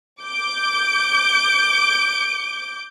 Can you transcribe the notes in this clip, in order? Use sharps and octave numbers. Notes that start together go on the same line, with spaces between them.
D6 G6 D7